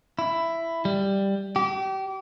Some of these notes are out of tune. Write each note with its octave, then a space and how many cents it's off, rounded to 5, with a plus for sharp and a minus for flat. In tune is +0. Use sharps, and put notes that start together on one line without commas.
E4 +10
G3 +5
G4 -30